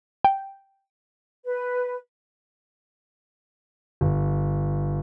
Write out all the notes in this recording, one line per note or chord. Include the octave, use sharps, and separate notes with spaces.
G5
B4
G1